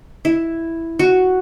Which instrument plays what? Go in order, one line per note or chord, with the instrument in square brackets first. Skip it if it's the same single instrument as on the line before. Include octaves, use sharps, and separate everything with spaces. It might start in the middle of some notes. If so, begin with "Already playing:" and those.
[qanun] E4
F#4